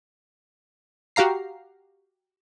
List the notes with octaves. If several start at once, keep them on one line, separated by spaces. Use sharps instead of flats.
F#4 G4 F5 A#5 C7